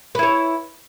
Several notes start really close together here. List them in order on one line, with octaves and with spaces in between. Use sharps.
B4 E4 C#5